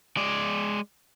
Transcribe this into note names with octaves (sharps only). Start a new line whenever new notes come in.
G#3 D5